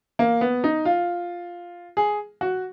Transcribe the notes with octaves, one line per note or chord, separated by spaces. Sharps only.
A#3
B3
D#4
F4
G#4
F#4